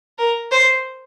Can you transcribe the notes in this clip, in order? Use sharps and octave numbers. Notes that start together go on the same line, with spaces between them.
A#4
C5